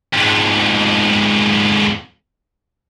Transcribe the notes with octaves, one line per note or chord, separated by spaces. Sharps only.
F2 G#2